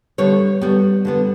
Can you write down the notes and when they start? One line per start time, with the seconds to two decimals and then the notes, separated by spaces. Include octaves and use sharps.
0.18 D3 G3 B3 C#5
0.61 D3 G3 B3
1.05 D3 G3 B3